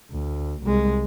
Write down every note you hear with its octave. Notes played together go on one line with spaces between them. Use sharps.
D2
C2 G#3